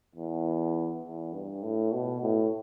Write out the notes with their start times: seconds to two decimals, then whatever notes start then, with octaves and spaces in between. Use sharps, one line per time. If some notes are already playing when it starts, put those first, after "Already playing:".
0.15 E2
1.04 E2
1.33 G2
1.63 A2
1.93 B2
2.22 A2